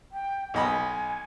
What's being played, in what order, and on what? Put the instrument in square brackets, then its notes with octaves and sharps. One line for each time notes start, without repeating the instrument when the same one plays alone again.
[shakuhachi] G5
[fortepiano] B1 D#5 B5 [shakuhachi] G#5